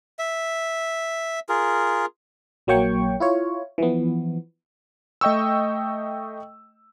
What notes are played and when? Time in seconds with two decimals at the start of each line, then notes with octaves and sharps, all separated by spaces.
0.19 E5
1.49 F4 G#4 A#4
2.67 A#1 F#3 A#3 C#5 G5 C#6
3.20 E4 F4 C#5
3.78 E3 F3 B3
5.21 A3 D#5 G5 C#6 E6